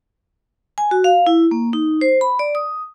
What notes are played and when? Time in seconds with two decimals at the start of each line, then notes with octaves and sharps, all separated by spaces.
0.78 G#5
0.91 F#4
1.04 F5
1.27 E4
1.51 A#3
1.73 D#4
2.01 C5
2.21 B5
2.39 D5
2.55 D#6